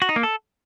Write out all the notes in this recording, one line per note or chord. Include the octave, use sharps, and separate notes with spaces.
F#4
D#4
A#3
A4